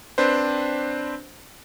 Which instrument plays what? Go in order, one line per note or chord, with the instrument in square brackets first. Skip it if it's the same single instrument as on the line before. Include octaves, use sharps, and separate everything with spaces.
[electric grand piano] C4 D4 B4 C5